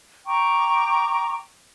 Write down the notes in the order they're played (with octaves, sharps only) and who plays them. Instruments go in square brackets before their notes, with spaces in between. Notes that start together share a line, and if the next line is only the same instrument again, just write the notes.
[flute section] G5 A#5 C#6 D6